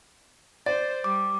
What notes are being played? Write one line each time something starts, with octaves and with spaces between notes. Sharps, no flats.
C5 D5 A6
G3 D6